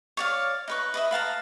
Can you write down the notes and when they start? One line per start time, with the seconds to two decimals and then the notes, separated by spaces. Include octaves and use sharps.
0.17 C#5 D5 F5
0.68 D#4 B4 C#6
0.94 B4 D#5 E5
1.11 B4 F5 A5 A#5